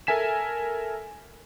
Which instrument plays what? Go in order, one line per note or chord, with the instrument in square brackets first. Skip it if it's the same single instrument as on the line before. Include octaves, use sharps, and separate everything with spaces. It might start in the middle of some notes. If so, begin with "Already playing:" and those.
[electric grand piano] A4 A#4 E5 G#5 B6 E7